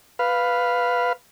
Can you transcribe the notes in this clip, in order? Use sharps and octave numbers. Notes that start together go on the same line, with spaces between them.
B4 F5